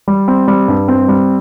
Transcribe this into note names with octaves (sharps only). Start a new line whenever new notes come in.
G3
C4
G3
G2
C4
G3